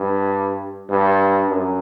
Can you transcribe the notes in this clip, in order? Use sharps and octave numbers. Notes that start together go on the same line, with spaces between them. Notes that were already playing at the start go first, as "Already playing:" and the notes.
Already playing: G2
G2
F#2